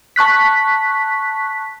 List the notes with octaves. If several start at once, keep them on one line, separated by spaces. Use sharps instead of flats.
A5 C#6 F#6 B6